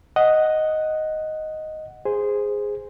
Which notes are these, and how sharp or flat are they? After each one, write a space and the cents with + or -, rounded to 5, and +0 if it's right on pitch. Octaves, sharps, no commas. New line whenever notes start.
D#5 +0 F#5 +0
G#4 -10 C5 -5